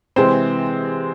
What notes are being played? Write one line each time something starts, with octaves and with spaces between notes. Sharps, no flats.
C3 E3 G#3 C4 C5